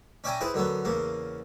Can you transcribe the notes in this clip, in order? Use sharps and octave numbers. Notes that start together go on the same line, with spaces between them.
C#4 D5 E5 G5 G#5 A#5
E4 G#4 B4 C5
F#2 D3 F#3 B3
E2 C#3 A#3